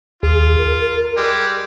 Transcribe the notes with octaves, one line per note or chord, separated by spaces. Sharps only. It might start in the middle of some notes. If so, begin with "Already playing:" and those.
D#2 F4 G#4
A#4
G3 G#3